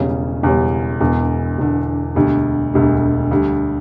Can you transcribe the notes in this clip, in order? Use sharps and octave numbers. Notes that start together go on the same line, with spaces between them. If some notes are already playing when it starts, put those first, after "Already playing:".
Already playing: E1 E2 C#3 G3 C#4
E1 E2 C#3 G3 C#4
E1 E2 D3
E1 E2 D3
E1 D2 D3 G3
E1 D2 D3 G3
D2 D3 G3